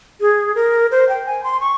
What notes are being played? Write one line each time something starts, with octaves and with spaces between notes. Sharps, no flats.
G#4
A#4
C5
G5
G#5
C6
C#6